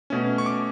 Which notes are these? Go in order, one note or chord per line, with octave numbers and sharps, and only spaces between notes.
B2 A3 C#4
C#6
D6